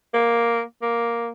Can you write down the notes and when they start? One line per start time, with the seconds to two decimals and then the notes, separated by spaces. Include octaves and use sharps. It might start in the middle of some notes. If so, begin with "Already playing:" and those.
0.14 A#3
0.82 A#3